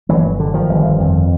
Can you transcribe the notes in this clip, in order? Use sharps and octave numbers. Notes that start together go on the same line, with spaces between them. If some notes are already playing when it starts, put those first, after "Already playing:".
G1 E3 F#3
D3
D#3 F3
G1
F2